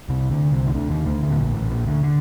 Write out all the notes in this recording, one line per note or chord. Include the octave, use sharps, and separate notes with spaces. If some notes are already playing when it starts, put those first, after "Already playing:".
C2 C3
D2 D3
C2 C3
D#3
D2 D3
D#2 D#3
D2 D3
D2 D3
A2
A#1 A#2
A1 A2
A#1 A#2
D2 D3
D3